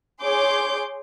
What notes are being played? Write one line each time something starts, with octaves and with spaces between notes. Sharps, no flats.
G#4 C#5 C6 D6 G6